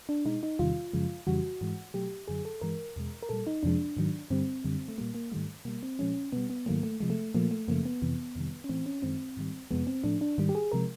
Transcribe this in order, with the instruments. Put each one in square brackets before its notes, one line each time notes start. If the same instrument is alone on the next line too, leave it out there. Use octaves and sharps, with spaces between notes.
[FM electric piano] D4
B2 G#3 D#4
D#4
E2 C3 D#3 G3 F4
F#2 C#3 F3 G#3
F2 C#3 E3 G3 F#4
G#2 E3 G#3
B2 F#3 A3 G4
F#2 D3 F#3 G#4
A4
G2 E3 G#3 A#4
E2 B2 G#3
A#4
A#2 G3 A4
D#4
F2 C3 F3 G#3 D4
G#2 D#3 F#3
G2 D3 G3 C4
F#2 D3 G3
A3
A#2 G3 A#3
A#3
G#2 D#3 G3 A3
B2 G3 A#3
C4
A#2 F3 G#3 C#4
B2 G3 B3
B3
G#2 D#3 F#3 A3 A#3
A3
C3 F3 G#3
A3
A#2 F3 A3 A#3
A3
F#2 C#3 F3 A3 A#3
B3
F2 C3 E3
F2 C3 D#3 G3
C#4
A2 E3 A3 C4
C#4
F#2 D#3 G#3 C4
G#2 D#3 G3
F2 C3 F3 G#3 B3
C4
A2 F3 A3 D4
D4
G#2 D#3 G3
G4
G#4
C3 F3 G#3 A#4